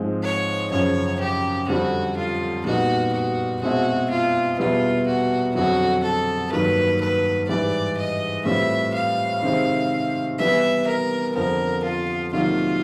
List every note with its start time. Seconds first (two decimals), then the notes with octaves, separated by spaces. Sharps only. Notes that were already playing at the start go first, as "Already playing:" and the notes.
Already playing: G#2 F3 G#3 C4
0.23 C#5
0.71 F#2 C#3 F3 C#5
1.20 G4
1.68 F2 D3 G3 C4 F#4
2.17 F4
2.65 A#2 G3 B3 D#4 F#4
3.13 F#4
3.61 B2 G#3 C4 E4 F#4
4.10 F4
4.58 E2 B2 G3 B3 E4 F4
5.07 F#4
5.55 F2 D3 F#3 F#4
6.04 A4
6.52 G2 D#3 F#3 A#3 D4 B4
7.01 B4
7.48 G#2 E3 G3 D5
7.97 D#5
8.45 A2 E3 G3 C4 F4 E5
8.94 F5
9.42 C3 D#3 G#3 C4 E4
10.39 E3 G3 B3 E5
10.87 A#4
11.35 F2 D3 F3 A#4
11.84 F4
12.32 C3 D#3 F#3 A#3 F4